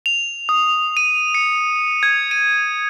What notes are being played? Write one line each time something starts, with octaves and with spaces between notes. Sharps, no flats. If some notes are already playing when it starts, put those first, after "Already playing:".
F7
D#6
D#7
C#7
G#6
D#7